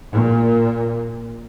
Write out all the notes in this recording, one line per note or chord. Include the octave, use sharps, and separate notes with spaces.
A#2